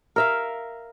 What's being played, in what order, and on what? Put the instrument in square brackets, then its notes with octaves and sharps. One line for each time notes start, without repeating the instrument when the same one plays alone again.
[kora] A#4 E5 F5